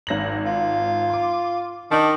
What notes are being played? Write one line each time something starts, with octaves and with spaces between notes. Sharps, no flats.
G#1 A#6 F#7
F4
C6 D6
D#3 D4 A5 D6 F#7